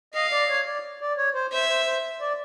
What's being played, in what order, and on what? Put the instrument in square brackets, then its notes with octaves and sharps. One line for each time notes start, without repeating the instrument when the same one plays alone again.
[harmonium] D#5 [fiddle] F5
[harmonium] D5
C#5
D5
D5
C#5
C5
[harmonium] C5 [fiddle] E5
[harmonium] C5
C5
D5